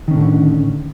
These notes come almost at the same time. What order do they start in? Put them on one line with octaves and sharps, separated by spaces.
D#3 C#4 A2 D3